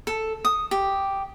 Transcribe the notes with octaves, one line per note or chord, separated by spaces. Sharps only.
A4
D#6
G4